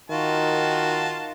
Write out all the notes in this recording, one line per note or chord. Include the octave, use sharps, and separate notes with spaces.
D#3 F4 F#4 A5